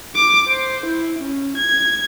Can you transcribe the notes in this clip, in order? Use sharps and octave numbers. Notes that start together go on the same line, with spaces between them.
D6
C5
E4
C#4
G#6